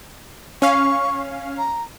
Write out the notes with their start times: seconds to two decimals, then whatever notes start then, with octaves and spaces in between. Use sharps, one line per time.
0.62 C#4 F5 C#6
1.58 A#5